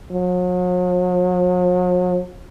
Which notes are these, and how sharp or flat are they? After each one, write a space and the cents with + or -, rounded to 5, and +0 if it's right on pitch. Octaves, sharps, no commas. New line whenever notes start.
F#3 -45